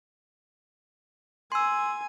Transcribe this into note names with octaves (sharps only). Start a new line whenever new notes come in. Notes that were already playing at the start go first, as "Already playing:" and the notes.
G#5 C6 E6